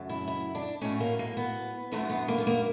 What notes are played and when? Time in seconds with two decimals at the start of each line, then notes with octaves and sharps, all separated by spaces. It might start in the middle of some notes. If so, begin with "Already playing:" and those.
Already playing: F#2 C#3 F#3 A3
0.09 E4
0.28 E4
0.55 D4
0.82 A2 F#3 A3 C#4
1.00 A#3
1.19 A#3
1.37 B3
1.92 F#2 D3 F#3 A3 B3
2.10 B3
2.28 A#3
2.38 B3
2.47 A#3